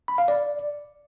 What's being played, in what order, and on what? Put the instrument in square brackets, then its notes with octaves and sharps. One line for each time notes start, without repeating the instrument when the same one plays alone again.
[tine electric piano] B5
F5
D5